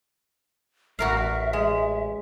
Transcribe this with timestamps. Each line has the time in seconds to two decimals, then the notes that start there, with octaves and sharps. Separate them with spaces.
0.99 A1 F#4 A#4 E5 F5
1.53 G#3